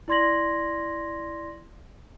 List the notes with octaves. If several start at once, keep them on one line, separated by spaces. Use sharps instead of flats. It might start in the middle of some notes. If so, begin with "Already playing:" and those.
E4 D5 C6 G#6 A#6 F#7